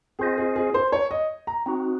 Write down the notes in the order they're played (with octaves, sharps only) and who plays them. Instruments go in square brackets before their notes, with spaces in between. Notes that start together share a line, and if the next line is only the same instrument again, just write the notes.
[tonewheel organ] C4 F4 C5 D#5 [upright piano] G#4
[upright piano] G#4
G#4
C5
C#5
D#5
A#5
[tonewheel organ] C4 D#4 F#4